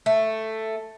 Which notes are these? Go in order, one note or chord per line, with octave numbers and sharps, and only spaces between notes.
A3